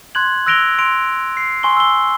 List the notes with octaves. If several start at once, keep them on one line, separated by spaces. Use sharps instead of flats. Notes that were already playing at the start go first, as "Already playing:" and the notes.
C6 F#6 G#6 F#7
E6 F#6 A#6 D7 F7 G7
C6 D7 F7
C7
G#5 C6 C#6 G7
E6 G7